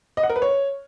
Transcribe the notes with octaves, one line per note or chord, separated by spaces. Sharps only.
D#5
F#5
A#4
B4
C#5